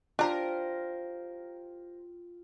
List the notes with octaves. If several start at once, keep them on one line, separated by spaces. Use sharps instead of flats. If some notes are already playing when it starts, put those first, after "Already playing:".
D4 F4 G4 A#4 C5 A#5